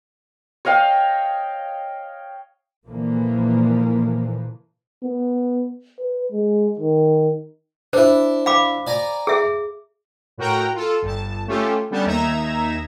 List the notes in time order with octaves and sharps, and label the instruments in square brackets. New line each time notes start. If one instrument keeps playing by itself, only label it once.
[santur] C#5 D#5 F5 G5
[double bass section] A#2 D3 E3 F3 A#3
[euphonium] B3
B4
G#3
D#3
[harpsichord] D4 E4 [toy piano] C5
[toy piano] F5 B5 D6
[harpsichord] D5 G#5 A#5
[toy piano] G#4 E5
[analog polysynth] A2 F#4 A#4 F#5 G5 A#5
F4 A4
G1 A5
A3 C#4 F4 G4 A4
D3 G3 B3 C#4 A5
D#2 D#4 E5 A#5 G#6 E7